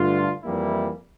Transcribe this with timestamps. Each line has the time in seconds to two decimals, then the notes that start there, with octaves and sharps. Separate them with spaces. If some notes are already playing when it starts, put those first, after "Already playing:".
Already playing: G2 D3 A3 D4 F4
0.43 F2 E3 G3 A#3 E4